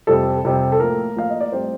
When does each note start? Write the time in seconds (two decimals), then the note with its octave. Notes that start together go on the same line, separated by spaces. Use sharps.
0.07 F2 C3 G3 C4 A4
0.45 F2 C3 G3 C4
0.72 A4
0.80 A2 F3 A#3 A#4
1.16 A2 F3 A#3 F5
1.30 D#5
1.41 D5
1.52 A2 G3 C4 C5